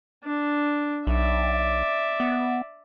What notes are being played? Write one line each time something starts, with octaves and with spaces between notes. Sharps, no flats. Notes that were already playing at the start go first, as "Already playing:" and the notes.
D4
B1 D5 E5
B3